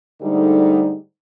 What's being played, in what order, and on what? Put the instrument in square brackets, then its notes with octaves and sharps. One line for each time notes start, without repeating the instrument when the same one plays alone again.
[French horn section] G#2 D3 G3 A3 D#4